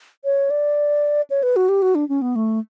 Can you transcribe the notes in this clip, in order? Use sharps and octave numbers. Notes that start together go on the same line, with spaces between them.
C#5
D5
C#5
B4
F#4
G4
F#4
D4
C#4
B3
A3